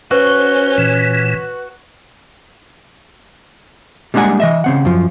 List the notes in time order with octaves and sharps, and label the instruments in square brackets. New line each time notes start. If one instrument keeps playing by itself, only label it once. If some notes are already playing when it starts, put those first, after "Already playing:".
[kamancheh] C#4 [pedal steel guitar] F#4 [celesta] B4 [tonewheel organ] C5
[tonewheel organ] A#2 E3
[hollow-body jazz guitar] G3 G#3 A#3 D4 F#5 G#5
E3 D#5 E5
C#3 C4 F#5
F#2 F3